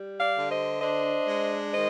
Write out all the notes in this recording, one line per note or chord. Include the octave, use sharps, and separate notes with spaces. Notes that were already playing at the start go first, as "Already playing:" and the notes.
Already playing: G3
D5 F5
D3
C5 D#5
D4 C5 D#5
G#3
D#3 C5 D#5